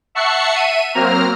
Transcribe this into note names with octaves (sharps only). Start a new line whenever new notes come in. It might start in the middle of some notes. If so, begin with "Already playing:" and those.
E5 F#5 A5 C#6 C7 C#7
E5 D#7
F#3 A#3 C4 A#5 F6